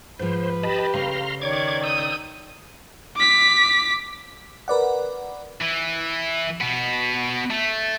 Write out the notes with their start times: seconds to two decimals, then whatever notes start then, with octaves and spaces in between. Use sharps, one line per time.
0.19 G#2 F3 B4 C5
0.63 G4 D#5 A5 B5
0.94 C#3 A3 F5 A#5 C6
1.42 D#3 C#5 D5 D6 G#6
1.84 D#6 E6 G6
3.16 D6 B6
4.68 A#4 B4 D5 F#5
5.62 E3
6.61 B2 B3
7.50 A3